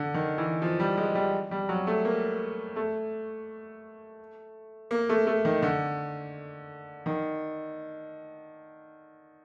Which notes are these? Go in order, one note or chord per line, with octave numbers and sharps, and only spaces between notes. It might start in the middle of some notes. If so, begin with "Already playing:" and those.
Already playing: D3
D#3
E3
F3
G3
G#3
G3
G3
F#3
A3
A#3
A3
A#3
A3
A3
D#3
D3
D#3